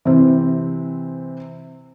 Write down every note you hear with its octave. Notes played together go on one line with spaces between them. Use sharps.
C3 E3 C4